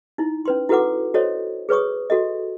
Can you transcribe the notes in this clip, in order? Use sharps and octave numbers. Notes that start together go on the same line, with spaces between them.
D#4 E4
C#4 B4 C6
E4 F#4 A4 B4 F#5 D6
F#4 A4 C5 C#5 D#5
G#4 B4 C#5 C#6 D#6
F#4 A4 D#5